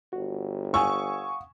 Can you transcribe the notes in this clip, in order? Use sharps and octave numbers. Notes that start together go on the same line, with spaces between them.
G1 F#4
F5 F#5 G#5 C#6 D#6 E6